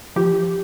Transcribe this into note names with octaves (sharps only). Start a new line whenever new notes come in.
F3 G4